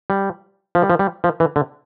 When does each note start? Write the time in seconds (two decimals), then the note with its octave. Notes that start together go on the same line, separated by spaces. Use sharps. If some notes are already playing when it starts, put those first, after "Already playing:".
0.10 G3
0.75 F3
0.82 G3
0.90 F3
0.99 G3
1.24 F3
1.40 E3
1.56 D3